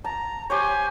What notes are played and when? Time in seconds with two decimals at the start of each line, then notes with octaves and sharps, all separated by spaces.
0.04 A5 A#5
0.50 G4 C5 C#5 G#5